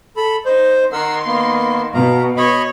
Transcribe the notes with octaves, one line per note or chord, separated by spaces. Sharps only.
A4 B5
D#4 C5
D#3 A#4 F#5 C6 E6
A#3 B3
B2 F5 A#5
C#5 D#5 B5